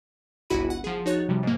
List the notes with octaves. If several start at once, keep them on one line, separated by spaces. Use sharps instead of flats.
G1 C#2 E4 F#4 B5 D#7
F#5
F3 G#4
D#4 F#4 C#5 F#6 A6
C3 F3 G3
G#2 A#3